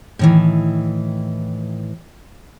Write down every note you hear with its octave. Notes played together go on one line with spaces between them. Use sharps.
A2 D#3 E3